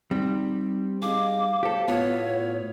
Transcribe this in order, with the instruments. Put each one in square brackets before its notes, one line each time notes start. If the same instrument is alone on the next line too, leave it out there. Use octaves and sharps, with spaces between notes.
[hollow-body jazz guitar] G3 [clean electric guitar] C4 [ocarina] D#4
[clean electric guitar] D#4 G#4 [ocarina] F5 [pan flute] D6
[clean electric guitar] F#4 C5 C#5 [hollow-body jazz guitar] G4 A4
[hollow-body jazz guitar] A2 B3 [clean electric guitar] F4 F#4 [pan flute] C#5